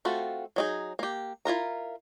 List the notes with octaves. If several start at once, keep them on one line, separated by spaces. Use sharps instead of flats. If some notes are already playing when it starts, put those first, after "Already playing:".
A3 C4 F4 F#4 A4
F#3 D#4 G#4
A#3 G4
E4 F4 A#4 A#5